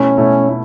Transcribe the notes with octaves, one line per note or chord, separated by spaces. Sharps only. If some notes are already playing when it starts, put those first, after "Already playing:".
Already playing: B2 A3 C#4 E4
B2 A3 E4
A3 E4